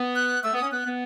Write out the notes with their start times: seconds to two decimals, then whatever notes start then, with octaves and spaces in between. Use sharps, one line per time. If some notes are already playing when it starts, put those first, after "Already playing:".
Already playing: B3
0.15 F#6
0.44 A3 E6
0.53 B3
0.57 C#4 D#6
0.71 B3 F#6
0.85 B3